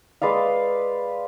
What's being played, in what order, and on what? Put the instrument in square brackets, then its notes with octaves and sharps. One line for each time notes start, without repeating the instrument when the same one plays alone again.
[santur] G#3 B4 D5 F5